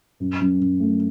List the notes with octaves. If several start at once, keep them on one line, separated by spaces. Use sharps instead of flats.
F#2
F#2
F#2
A3